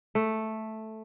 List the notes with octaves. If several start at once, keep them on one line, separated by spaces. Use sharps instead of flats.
A3